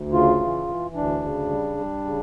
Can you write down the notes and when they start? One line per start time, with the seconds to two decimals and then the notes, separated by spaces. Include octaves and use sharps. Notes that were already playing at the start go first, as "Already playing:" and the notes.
Already playing: D2
0.13 C#3 F4
0.40 E3
0.68 E3
0.95 D2 D4
1.23 C#3
1.50 G3
1.78 G3
2.05 C#3